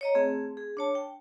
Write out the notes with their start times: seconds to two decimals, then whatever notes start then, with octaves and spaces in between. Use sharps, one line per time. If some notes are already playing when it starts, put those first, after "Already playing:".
0.01 C#5 D#5 A#5
0.15 A3 C4 G#4
0.57 G#4
0.77 D4 C#5 A5
0.95 G5